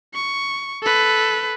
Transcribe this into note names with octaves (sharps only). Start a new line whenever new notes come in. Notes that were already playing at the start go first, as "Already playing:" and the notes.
C#6
A4 B4